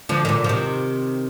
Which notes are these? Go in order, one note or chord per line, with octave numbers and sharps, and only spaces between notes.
D3 F3
D#3
A#2 D3
F3
C3 D#3